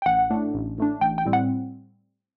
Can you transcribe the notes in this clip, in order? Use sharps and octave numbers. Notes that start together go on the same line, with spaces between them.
G5
A1 F#5
A2 A3 D4
A1
A2 A3 D4
A1 G5
G5
A2 G3 C4
F#5